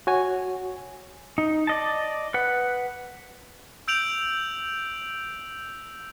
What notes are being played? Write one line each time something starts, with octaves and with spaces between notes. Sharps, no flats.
F#4 C#5 G#5
D#4
D5 D#5 A5
B4 F#5
E6 G6 D7 F7 F#7